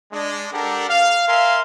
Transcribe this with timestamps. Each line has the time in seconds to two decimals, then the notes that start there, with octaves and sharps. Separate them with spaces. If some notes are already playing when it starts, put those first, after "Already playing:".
0.13 G#3 D4
0.52 D4 G4 A4 A#4 F#5
0.89 F5
1.27 A#4 E5 F5 G#5 C6